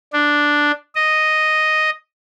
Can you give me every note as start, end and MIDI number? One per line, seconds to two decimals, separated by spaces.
0.13 0.71 62
0.95 1.90 75